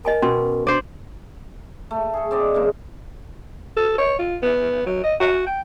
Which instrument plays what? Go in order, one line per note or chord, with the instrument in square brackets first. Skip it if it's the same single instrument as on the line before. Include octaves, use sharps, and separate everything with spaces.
[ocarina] A#4 [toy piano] D#5 G#5 A5
[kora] B2 [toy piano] C#4 C6
[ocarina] D4 [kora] C5 D5
[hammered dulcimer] A3
G#4 A4
C4 D5 D#5
C#3 E3 G#3 A#3
[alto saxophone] A4
C#5
F4
B3
F#3
D#5
F#4
G5